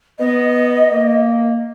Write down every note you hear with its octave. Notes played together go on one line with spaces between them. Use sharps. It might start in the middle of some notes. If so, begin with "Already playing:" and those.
B3 D#5
A#3